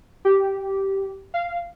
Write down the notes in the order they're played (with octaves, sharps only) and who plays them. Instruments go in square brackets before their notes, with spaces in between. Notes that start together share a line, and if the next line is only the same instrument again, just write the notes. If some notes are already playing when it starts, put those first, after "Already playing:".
[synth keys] G4
F5